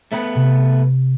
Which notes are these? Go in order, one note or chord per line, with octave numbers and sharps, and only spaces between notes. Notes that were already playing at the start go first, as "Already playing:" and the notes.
A3 B3 B4
C3